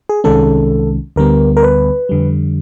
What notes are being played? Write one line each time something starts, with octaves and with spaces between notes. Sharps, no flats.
G#4
C2 C3 D#3 G#3 C#4 A4
D2 D3 G3 B3 A#4
A#4
B4
F2 D3 G3